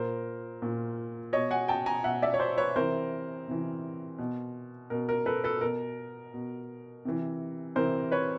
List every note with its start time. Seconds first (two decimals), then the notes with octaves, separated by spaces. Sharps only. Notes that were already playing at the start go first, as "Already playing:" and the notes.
Already playing: A#2 A#4 C5
0.62 A#2
1.33 B2 C#5 D#5
1.51 F#5 G#5
1.68 G5 A5
1.86 G#5 A#5
2.04 B2 E5 F#5
2.22 D5 E5
2.34 C#5
2.40 C5 D5
2.58 B4 C#5
2.76 C3 E3 A#4 C5
3.48 C3 E3
4.18 B2
4.90 B2 A#4
5.09 A#4
5.26 A4 B4
5.44 A4 B4
5.61 B2 A#4
6.34 B2
7.05 C3 E3
7.75 C3 E3 A#4 C5
8.12 B4 C#5